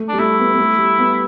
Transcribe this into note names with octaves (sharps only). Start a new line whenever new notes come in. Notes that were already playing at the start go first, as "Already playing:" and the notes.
Already playing: A3
G3 D4
A3 E4
B3
B3
A3
G3
B3